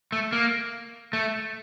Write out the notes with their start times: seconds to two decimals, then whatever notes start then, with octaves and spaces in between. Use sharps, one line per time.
0.12 A3
0.33 A#3
1.13 A3